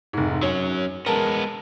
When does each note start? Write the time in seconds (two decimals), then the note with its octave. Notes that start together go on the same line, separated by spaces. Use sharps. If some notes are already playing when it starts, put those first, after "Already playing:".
0.13 F1 G#2
0.43 F#3 C#4 C#5
1.06 G#3 B3 A#4 A5